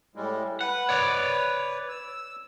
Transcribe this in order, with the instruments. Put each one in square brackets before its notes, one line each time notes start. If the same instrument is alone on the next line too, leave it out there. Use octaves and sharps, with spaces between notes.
[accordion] A2 G3 G#3
[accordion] B4 [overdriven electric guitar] F#5
[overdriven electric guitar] C#5 D5
[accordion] E6